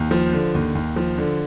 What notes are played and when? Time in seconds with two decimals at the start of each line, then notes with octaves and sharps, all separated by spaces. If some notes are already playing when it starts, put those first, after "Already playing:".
Already playing: D#2
0.11 F3
0.33 D3
0.55 D#2
0.75 D#2
0.96 F3
1.18 D3